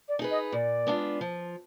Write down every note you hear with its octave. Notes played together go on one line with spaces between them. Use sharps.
D5
D#4 G#4 B4
D#5
A#2 D5
G#3 B3 D4 F4
F3